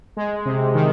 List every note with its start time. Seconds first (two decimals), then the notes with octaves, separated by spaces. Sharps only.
0.17 G#3
0.45 C3
0.75 D#3